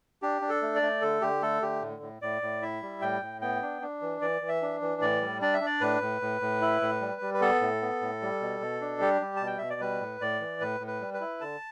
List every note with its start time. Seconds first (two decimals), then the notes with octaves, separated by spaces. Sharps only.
0.22 D4 G4
0.42 D4
0.49 A4
0.62 A3
0.75 D5
0.82 A3
1.02 D3 A4
1.21 D3 G4
1.42 A3 A4
1.62 D3 G4
1.82 A2
2.02 A2
2.22 A2 D5
2.42 A2
2.62 E4 E5
2.82 G3
3.02 A2 G5
3.22 A2
3.42 B3 G5
3.62 D4
3.82 D4
4.02 E3
4.21 E3 D5
4.41 E3
4.49 E5
4.62 D4
4.82 E3
5.01 A2 D5
5.21 G3
5.41 D4 D5
5.54 E5
5.61 D4
5.66 D5
5.81 A2 B4
6.01 A2
6.22 A2
6.41 A2
6.61 E4
6.81 A2
7.01 G3
7.21 G3
7.34 B4
7.41 B3 A4
7.61 A2
7.82 B3
8.01 A2
8.22 G3
8.41 B2
8.61 B2
8.81 D4
9.01 G3 G4
9.21 G3
9.36 B2 A5
9.47 G5
9.58 B2 E5
9.70 D5
9.81 G3 B4
10.01 A2
10.21 A2 D5
10.40 E3
10.60 A2 B4
10.80 A2
10.87 B4
11.01 G3
11.14 B4
11.21 E4
11.41 D3 A5